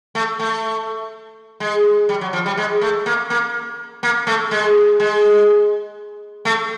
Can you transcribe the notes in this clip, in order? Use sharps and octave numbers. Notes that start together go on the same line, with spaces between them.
A3
A3
G#3
G3
F#3
F3
G3
G#3
A3
A#3
A#3
A#3
A3
G#3
G#3
A3